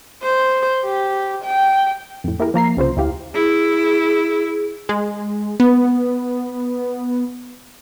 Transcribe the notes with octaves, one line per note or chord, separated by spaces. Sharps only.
C5
G4
G5
F2 A2
A#3 E4 G4 G#4 A#4
F3 A#3 A#5 C7
C2 C#3 F4 C5
D2 E4 G4 F5
E4 G#4
G#3
B3